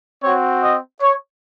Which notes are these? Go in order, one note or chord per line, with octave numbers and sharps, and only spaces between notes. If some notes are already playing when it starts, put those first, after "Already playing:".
C4 F#4 C#5
D#5
C#5